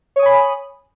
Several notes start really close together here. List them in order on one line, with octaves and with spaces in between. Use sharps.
C#5 D#6 G#5 B5